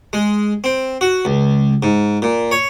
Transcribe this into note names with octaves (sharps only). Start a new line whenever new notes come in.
G#3
C4
F#4
C#2
G#2
A#2
C#5